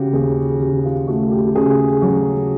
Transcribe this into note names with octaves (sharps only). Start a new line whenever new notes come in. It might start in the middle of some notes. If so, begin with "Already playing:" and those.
Already playing: C#3 F#4 G4
D#2 G#4
C#3 G4
F4
A3 F#4
G4
C#3 G#4
F#3 F#4